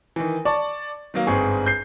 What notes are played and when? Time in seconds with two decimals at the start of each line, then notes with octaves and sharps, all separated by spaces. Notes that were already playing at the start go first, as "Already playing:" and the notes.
0.16 D#3 E3
0.45 D5 A5 C#6
1.14 D#3 F#3 A#3
1.27 G1 G#2 C4 G#4 C#6
1.66 G6 C7